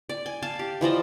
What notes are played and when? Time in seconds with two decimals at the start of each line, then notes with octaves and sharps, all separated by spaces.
0.09 D5
0.26 G#5
0.42 F5 A5
0.59 G4
0.81 E3 F3 D5 D#5